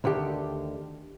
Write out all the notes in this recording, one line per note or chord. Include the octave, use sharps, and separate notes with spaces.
D2 D3 D#3 G4